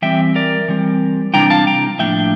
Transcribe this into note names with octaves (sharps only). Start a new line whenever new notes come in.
E3 G3 C4 E5 G5
A#4 D5
E3 G3 C4
C3 E3 G3 D4 G5 A#5
F5 A5
G5 A#5
A2 F3 A#3 D4 E5 G5